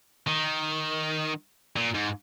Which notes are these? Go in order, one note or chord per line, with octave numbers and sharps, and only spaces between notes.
D#3
A#2
G#2